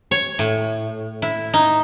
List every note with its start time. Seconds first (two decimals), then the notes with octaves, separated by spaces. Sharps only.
0.11 C#5
0.39 A2
1.22 E4
1.53 D#4